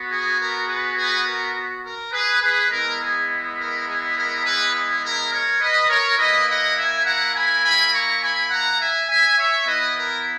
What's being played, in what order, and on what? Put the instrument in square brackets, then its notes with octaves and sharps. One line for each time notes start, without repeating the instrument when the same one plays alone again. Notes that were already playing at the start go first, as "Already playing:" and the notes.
Already playing: [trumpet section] B3 F#4
G#4
A#4
G#4 B4
G#4 B4
A#4
A#4
G#4 B4
G#4 B4
G#3 B3 E4 A#4
G#4
A#4
G#4
A#4
G#4 B4
G#4
A#4
A#4 C#5
B4 D#5
A#4 C#5
A#3 E4 B4 D#5
D#5 F#5
E5 G#5
F#5 A#5
G#5 B5
G#5 B5
A#5 C#6
G#5 B5
F#5 A#5
E5 G#5
E5 G#5
C#5 E5
B3 E4 B4 D#5
A#4